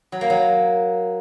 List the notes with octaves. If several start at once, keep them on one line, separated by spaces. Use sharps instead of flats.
F#3
A#3
F#3